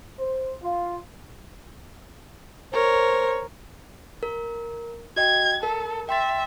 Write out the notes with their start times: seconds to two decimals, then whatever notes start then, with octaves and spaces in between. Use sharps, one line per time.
0.18 C5
0.62 F4
2.73 A#4 C5 C#5
4.23 A#4
5.16 F#4 D#5 G5 G#6
5.63 A4 A#4
6.09 E5 G5 C6 A6